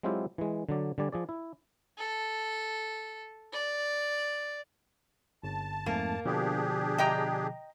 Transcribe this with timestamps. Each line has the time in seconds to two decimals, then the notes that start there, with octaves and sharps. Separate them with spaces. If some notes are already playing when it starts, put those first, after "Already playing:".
0.03 F#3 G#3 C4 E4 F4 G4
0.38 E3 G#3
0.69 D3 F#3 D5
0.98 D3 G3 D5 G#5
1.12 F3 G#4 D5
1.29 E4
1.98 A4
3.53 D5
5.43 G1 A5
5.86 F2 G#2 A3 A#3
6.26 B2 D3 F3 D4 G4 G#4
6.98 D#5 G5 A#5